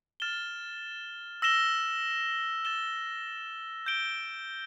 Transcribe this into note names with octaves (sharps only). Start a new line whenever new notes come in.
F6 A6 E7 G7
E6 A#6 E7 G7
A6 E7 G7
G6 D7 G7